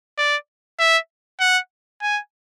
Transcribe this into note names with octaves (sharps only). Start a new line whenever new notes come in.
D5
E5
F#5
G#5